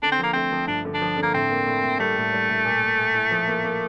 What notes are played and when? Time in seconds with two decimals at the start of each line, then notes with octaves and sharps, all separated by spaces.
0.03 D3 D4
0.12 C4
0.19 F3 A#3
0.33 A3 C4
0.52 F3
0.68 G2 D4
0.85 D3
0.94 D4
1.02 F3
1.17 D3
1.23 A#3
1.34 A2 C4
1.50 A#3
1.66 A2
1.83 A2
1.99 G3 A3
2.16 A2
2.33 G3
2.49 A2
2.65 A#2
2.82 A#2
2.98 A#2
3.15 E4
3.31 F3
3.47 A#3
3.64 A#3